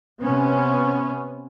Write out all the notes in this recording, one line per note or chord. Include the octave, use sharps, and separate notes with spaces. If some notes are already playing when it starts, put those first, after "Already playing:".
C3 B3 C#4